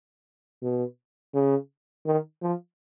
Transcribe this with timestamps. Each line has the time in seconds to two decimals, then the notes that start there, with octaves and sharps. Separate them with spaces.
0.62 B2
1.34 C#3
2.06 D#3
2.42 F3